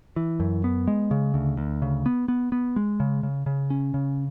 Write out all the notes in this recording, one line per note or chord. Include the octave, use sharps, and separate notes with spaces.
E3
F#2
B3
G#3
C#3
D2
D2
C#3
B3
B3
B3
G#3
C#3
C#3
C#3
C#4
C#3